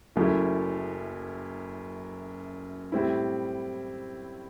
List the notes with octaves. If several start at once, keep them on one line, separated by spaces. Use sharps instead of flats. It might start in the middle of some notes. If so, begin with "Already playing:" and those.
F#1 F#2 F#3 A3 E4
A2 G3 C4 E4